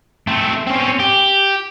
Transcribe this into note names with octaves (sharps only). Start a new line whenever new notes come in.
A3 C4
C4 C#4
G4